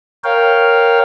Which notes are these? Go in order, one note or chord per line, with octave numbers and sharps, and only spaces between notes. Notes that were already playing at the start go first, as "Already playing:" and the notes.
A#4 C#5 F5 G5